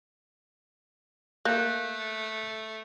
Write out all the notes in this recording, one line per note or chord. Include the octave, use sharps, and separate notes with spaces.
A3 A#3 F#6 G6